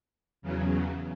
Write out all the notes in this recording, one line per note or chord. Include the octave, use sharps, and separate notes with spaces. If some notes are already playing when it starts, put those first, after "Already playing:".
E2 C#3 F#3